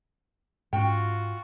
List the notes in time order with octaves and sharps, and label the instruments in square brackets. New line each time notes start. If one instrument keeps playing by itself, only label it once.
[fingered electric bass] G#2 C#4 [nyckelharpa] F4 F#4 [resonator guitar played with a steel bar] G5